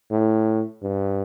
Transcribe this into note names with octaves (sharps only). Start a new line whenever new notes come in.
A2
G2